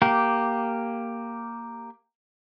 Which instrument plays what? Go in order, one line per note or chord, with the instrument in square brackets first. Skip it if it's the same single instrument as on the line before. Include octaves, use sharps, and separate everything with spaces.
[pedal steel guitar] A#3 G4